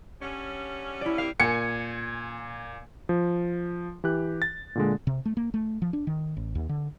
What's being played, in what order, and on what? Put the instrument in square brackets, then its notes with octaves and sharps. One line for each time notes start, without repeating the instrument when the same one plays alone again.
[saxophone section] D3 G3 C#4
[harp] E4 D5
[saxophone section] G3 A#3 C4 [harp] F5
[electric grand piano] A#2 [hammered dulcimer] G#5 [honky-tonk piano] C#7
[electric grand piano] F3
E3 G4 F#6
A6
A#2 D3 G#3
[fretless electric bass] C3
A3
A#3
A3
F3
D4
D#3
A1
D#2
D3